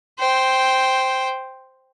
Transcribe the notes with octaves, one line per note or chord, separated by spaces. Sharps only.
C5 G5